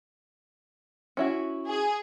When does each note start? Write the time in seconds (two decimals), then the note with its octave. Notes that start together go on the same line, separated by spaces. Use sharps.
1.17 C#4 E4 F#4
1.67 G#4